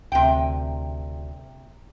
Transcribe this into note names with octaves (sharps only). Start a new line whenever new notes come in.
D2 C3 G5